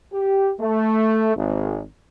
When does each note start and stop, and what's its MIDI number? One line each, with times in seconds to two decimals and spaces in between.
0.13 0.51 67
0.60 1.32 57
1.35 1.81 32